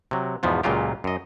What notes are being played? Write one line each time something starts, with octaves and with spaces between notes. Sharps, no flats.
C3 F#3
E2 G#2 B2 F3 B3
C#2 A#2 C#3 F#3 F4 G4
F#2 D#5